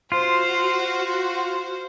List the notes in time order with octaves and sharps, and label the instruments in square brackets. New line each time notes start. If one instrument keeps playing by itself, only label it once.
[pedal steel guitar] F4 [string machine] F#4 [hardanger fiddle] C5